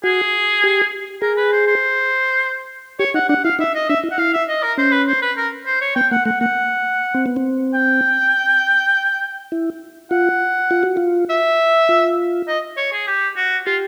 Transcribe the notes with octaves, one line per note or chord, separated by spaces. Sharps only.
F#4 G#4
G4
G#4 A#4
B4
C5
C5
G4 C#5
D#4 F#5
D4 F#5
E4 F5
D#4 E5
D#5
D4 E5
E4
F#5
E4 F5
E5
D#5
A#4
C#4 C5
B4
C5
B4
A#4
C5
C#5
B3 G5
A#3 F#5
A3 F#5
A#3 F#5
C4
B3
C4
G5
E4
F4 F#5
F4
F#4
F4
E5
F4
D#5
C#5
G#4
G4
F#4
F4 G4